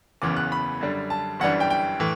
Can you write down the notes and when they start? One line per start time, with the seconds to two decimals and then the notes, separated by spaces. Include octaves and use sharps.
0.22 F#1 E2 C#3 E3 B3 D6
0.37 F#6
0.52 B5
0.81 F#2 D3 G3 D4
1.10 A5
1.40 G1 F#2 E3 G3 D4 F#5
1.60 G5
1.70 G5
2.00 A2 E3